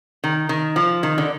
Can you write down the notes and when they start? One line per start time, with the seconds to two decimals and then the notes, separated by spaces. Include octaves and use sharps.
0.24 D#3
0.49 D#3
0.76 F3
1.03 D#3
1.18 D3